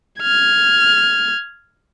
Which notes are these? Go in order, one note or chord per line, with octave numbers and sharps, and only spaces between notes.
F6 G#6